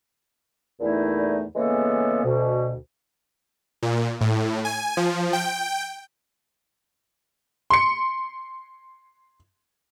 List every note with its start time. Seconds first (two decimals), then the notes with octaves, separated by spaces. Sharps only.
0.81 E2 A#2 D3 A3 D#4 E4
1.56 C#3 E3 G#3 A#3 B3 A4
2.24 D2 B2
3.83 A#2
4.21 A2
4.65 G#5
4.97 F3
5.33 G5
7.70 C6 C#7